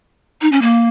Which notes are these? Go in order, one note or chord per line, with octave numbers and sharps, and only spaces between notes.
D#4
C#4
A#3